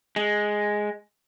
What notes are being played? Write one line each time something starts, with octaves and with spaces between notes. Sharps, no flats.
G#3